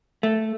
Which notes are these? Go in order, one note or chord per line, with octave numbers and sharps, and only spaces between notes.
A3